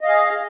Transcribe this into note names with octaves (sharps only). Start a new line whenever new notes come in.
G#4 D#5 F5